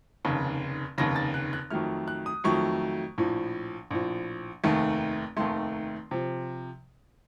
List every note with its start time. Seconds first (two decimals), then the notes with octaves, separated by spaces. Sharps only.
0.25 F1 D#2 C#3
0.98 F1 D#2 C#3 A#6
1.16 A6
1.34 F#6
1.53 F#6
1.70 F2 D#3 F#3 A3 F6
2.08 F#6
2.26 D#6
2.44 F2 D#3 F#3 A3 C#6
3.18 A#1 A2 F3
3.91 A#1 A2 F3
4.64 F1 D#2 D#3 A3
5.37 F1 D#2 D#3 A3 C6
6.11 C3 F3